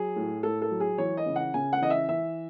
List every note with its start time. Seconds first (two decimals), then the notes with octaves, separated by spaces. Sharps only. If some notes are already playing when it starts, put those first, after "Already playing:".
Already playing: F#3 G#4
0.16 A2
0.43 A2 A4
0.62 A4
0.71 F#3
0.80 G#4
0.98 E3 C#5
1.17 D#5
1.26 C#3
1.36 F#5
1.54 C#3 G#5
1.73 F#5
1.81 E3 D#5
1.90 E5
2.09 E3 E5